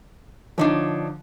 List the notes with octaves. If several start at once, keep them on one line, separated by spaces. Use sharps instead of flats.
D3 F3 D4 D#4 C#5